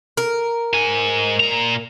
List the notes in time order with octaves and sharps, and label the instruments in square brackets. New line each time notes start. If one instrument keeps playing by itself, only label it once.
[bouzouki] A#4
[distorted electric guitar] G#2 G#5
A#2 A#5